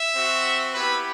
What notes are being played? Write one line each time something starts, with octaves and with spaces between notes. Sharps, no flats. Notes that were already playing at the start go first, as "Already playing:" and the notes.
Already playing: E5
C4 F#4
B3 E4 G4 B4